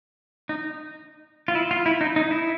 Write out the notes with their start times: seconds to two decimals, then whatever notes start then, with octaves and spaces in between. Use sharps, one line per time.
0.49 D#4
1.48 F4
1.55 E4
1.71 F4
1.86 E4
2.01 D#4
2.16 D#4
2.31 E4